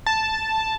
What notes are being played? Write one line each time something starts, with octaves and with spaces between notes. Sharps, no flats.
A5